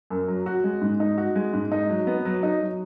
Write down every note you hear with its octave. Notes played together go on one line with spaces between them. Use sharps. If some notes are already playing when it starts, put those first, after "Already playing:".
F#2
F#3
F#4
G#3
G#2
D#4
F#4
G#3
G#2
D#4
F#3
B3
F#3
D#4
F#3